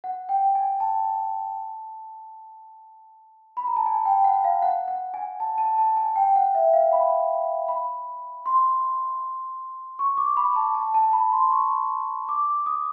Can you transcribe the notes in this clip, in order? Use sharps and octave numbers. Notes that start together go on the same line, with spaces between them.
F#5
G5
G#5
A5
B5
A#5
A5
G#5
G5
F#5
F5
F#5
F#5
G#5
A5
A5
A5
G#5
G5
F#5
E5
F5
B5
B5
C6
C#6
D6
B5
A5
A5
A5
B5
C6
C#6
D6
D#6